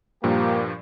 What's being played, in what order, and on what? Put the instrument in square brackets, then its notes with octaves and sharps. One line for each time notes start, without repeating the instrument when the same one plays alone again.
[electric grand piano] G2 A#2 F3 [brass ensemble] A#3 G4